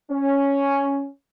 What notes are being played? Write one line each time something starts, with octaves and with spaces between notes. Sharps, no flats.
C#4